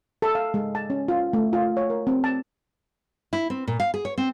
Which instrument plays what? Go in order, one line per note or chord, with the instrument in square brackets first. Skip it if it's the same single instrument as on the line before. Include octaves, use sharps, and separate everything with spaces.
[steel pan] A4
F5
G#3
A5
C#4
F4
A3
F4
C#5
A#4
C4
A5
[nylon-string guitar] E4
C4
A#2
F5
G#4
C#5
C4